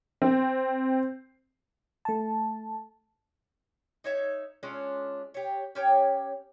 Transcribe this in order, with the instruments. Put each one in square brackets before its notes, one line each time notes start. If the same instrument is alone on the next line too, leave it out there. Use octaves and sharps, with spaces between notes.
[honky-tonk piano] C4
[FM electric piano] A3 A5
[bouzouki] D#4 C#5 E5
G#3 C#4 D4 F4
G4 C#5
C#4 G4 C#5 G5